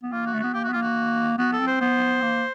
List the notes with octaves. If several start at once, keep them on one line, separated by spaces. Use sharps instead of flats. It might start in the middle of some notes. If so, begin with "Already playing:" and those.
B3
A#3 F4
F#4
A3
B3 F#4
A#3 G4
B3 F#4
A#3 F4
F#4
B3 F#4
A4
C4
C5
B3 C5
A#3